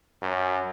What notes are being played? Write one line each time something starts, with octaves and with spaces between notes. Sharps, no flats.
F#2